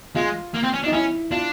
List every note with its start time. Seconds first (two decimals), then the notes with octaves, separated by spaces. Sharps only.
0.15 G#3 F4
0.54 A#3
0.64 C4
0.74 C#4
0.83 D4
0.86 D#4
0.93 C#4 E4
1.31 D4 F4